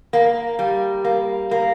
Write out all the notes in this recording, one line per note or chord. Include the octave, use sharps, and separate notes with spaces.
A#3
G3
A#3
A#3